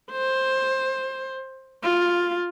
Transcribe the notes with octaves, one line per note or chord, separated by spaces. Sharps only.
C5
F4